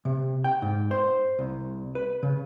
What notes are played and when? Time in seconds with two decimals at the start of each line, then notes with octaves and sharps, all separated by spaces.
0.05 C3
0.44 G5
0.62 G#2
0.91 C5
1.39 C2
1.95 B4
2.23 C#3